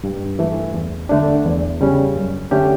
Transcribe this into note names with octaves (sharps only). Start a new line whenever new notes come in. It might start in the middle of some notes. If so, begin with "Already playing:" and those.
G2
E3 A3
E2
D3 A3 D4
E2
C#3 G3 C#4
F#2
D3 A3 C#4 G4